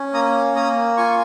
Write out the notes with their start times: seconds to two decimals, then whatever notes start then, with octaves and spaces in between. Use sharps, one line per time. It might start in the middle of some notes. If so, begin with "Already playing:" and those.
Already playing: C#4
0.14 A#3 A#5 D#6
0.55 A#3 A#5 D#6
0.97 F4 G#5 C#6